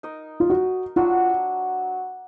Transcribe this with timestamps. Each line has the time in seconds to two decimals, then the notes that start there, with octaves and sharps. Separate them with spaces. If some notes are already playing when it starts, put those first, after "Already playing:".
0.03 D#4 A#4 D#5
0.40 F4
0.50 F#4
0.96 F#3 D4 F4 F#4